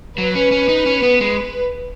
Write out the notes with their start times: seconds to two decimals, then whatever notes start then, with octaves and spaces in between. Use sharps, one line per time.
0.18 F#3 B4
0.35 C#4
0.52 C#4
0.69 D#4
0.86 C#4
1.03 B3
1.21 G#3